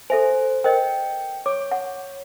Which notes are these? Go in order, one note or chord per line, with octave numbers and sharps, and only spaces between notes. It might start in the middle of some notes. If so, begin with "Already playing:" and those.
A4 C5 E5 G#5
A#4 C5 D#5 G5
C#5 D6
F#5